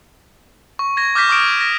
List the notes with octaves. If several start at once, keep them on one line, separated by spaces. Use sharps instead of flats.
C#6
G#6 A#6
D6 F6 G6 A#6 B6
C#6 D#6 F6 D7 E7
A#6